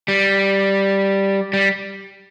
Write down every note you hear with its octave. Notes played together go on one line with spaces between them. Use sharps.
G3
G3